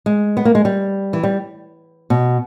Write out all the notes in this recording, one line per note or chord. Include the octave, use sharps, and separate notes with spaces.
G#3
B3
A#3
G#3
G3
E3
G3
B2